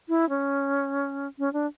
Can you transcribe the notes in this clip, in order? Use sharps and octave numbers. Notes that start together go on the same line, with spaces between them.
E4
C#4
C#4
D4